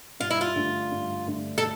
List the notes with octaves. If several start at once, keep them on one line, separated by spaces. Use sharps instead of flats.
G2 F4
E4
F4
D3 A3
G2
D3 A3
A4